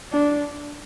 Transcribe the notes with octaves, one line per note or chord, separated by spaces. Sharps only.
D4